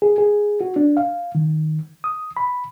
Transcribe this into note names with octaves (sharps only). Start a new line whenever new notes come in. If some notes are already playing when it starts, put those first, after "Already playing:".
G#4
G#4
F#4
D4
F5
D#3
D#6
B5